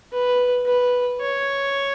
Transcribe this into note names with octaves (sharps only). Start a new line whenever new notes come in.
B4
B4
C#5